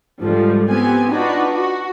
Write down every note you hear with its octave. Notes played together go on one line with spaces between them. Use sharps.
G#2 D3 F3 G3
B3 C4 G4 G#5
D4 D#4 F4 F#4 B4
F#4